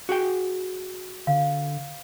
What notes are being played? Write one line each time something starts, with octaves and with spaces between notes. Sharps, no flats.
F#4 G#4 G5
D3 F5